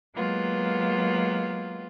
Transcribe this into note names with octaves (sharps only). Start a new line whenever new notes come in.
F#3 G#3 A#3 B3 F4